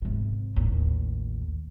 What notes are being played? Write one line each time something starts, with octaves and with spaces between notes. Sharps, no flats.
G#1 C3
A1 D#2